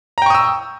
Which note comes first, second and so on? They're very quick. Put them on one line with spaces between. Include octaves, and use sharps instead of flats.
A#5 G5 C#6 D#6 E6